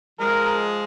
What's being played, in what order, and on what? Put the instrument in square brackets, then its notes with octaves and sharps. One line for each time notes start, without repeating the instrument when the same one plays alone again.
[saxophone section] F3 G#3 [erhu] A#4